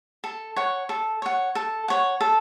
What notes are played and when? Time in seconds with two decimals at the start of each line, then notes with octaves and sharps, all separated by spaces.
0.24 A4
0.56 C#5 F#5
0.89 A4
1.22 C#5 F#5
1.55 A4
1.88 C#5 F#5
2.21 A4